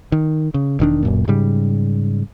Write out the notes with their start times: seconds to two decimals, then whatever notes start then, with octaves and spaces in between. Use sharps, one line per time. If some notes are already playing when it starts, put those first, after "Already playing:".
0.12 D#3
0.54 C#3
0.80 E1 D#3 D4
1.03 D1 F#2 A#2
1.28 G#2 C#3 G3